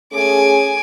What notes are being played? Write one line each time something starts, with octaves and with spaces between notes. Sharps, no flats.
A3 C#4 G#4 G#5 D6